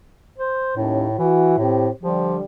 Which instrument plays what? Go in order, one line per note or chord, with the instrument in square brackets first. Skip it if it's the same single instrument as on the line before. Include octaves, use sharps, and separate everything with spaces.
[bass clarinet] C5
[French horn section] D#2 C#4 [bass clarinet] A2
[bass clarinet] E3 [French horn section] E4 F#4
[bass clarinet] A2 [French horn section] C4 G4
[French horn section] D3 G3 G4 [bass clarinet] F3